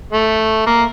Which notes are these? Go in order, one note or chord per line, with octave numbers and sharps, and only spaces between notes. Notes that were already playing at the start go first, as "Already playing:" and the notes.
A3
A#3